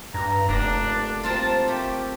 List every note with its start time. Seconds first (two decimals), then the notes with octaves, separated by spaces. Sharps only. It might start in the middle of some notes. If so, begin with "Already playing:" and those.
0.14 G2 A#5
0.49 F1 A#3 D4
1.23 A#3 C4 F4 A5
1.68 A3 G4